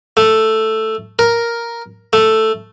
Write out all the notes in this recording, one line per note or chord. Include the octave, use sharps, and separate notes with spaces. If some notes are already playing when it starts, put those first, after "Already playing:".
A3
A#4
A3